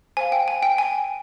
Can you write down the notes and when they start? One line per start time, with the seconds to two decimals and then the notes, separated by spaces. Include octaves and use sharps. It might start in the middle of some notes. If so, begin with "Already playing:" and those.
0.17 C5 F5 G#5
0.32 G5
0.48 G#5
0.63 G5
0.78 G#5